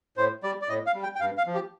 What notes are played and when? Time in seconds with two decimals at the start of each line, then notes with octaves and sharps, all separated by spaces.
0.17 A2 C5
0.43 G3 D5
0.62 D5
0.69 A2 D#5
0.87 F5
0.94 G3
1.03 G5
1.15 G5
1.20 G2 F5
1.37 F5
1.47 F3
1.55 G4